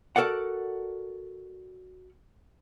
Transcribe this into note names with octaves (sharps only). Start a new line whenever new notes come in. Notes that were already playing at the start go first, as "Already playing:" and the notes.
F#4 A4 A#4 D5 F#5